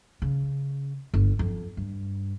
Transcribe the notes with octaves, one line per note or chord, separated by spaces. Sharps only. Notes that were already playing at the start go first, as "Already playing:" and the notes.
C#3
G1
F2
G2